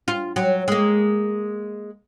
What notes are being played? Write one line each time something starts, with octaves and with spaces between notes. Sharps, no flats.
F4
F#3
G#3 A#3